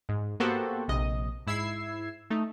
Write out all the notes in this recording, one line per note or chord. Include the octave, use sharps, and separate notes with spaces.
G#2
A#3 B3 F#4 G4 A4 C5
A#1 C3 D#5
G#2 E4 E6 G#6 C7
A3 D#4